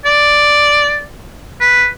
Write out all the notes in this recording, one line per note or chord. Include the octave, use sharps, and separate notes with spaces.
D5
B4